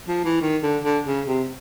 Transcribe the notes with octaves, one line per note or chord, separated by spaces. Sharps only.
F3
E3
D#3
D3
D3
C#3
C3